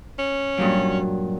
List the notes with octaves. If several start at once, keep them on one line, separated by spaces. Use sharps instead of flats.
C#4
G2 A#2 F#3